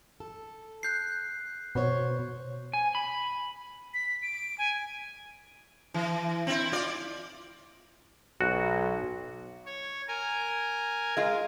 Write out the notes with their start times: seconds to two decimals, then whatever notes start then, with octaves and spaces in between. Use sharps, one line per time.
0.20 A4
0.83 F#6 G6 C7
1.75 B2 B3 C5 C#5
2.73 G#5
2.95 B5
3.94 B6
4.22 D7
4.58 G#5
5.94 E3
6.47 C4 E4
6.72 F4 D5
8.41 B1 F#4
9.66 C#5
10.08 A#4 G#5
11.17 G#3 F4